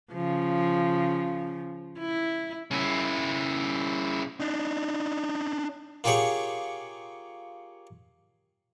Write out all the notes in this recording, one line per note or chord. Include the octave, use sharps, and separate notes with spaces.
C#3 F3
E4
C#3 E4
D4 D#4
A#3 F4 G4 G#4 C#5 F#5